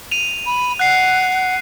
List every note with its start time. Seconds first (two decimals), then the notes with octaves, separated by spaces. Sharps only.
0.11 D#7 F7
0.46 B5
0.79 F#5 F#6 C7